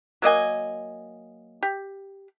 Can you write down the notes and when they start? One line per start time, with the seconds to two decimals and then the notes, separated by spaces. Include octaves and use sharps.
0.22 F#3 A#3 D#5 G#5
1.63 G4